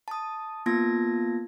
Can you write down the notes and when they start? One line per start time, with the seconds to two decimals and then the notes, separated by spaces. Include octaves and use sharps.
0.08 A5 D#6
0.66 A#3 B3 F4 A5 G#6 A#6